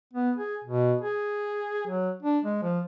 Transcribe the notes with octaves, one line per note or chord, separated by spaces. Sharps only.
B3
G#4
B2
G#4
F#3
D4
G#3
F3